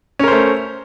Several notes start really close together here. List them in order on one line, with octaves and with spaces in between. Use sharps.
C#4 A#4 C5 A3